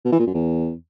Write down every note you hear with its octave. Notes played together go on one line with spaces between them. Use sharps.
B2
E3
A#2
F#2
E2